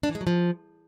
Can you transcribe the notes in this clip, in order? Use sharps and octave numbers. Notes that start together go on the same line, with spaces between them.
D4
E3
G#3
F#3
F3